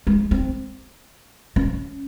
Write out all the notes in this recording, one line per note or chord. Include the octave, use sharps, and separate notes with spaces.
G#3
C4
C#4